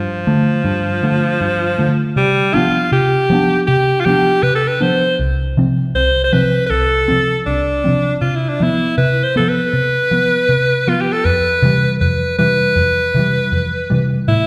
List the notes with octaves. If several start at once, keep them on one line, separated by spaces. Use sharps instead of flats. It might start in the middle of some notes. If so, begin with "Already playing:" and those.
Already playing: G2 F3
D3 A3
G2
D3 A3
G2
D3 A3
C3 G3
F3 B3 D4 F4
C3 G4
F3 B3 D4
C3 G4
F4
F3 B3 D4 G4
C3 B4
A4
B4
F3 B3 D4 C5
C2
C3 F3 C4
C2 C5
C5
C3 F3 C4 B4
B4
C2 A4
C3 F3 C4
C2 D4
C3 F3 C4
C3 F4
E4
D4
F3 B3 E4
C3 B4
C5
F3 B3 A4
B4
C3
F3 B3
C3
F3 B3 F4
G4
A4
F2 B4
C3 E3 G3
F2 B4
C3 E3 G3 B4
F2
C3 E3 G3
F2
C3 E3 G3
A2 E4